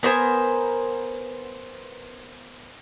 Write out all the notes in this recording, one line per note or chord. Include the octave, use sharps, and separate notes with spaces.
B3 A#4 C5 G#5